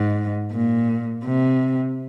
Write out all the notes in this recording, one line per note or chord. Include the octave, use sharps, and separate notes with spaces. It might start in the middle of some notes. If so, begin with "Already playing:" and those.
Already playing: G#2
A#2
C3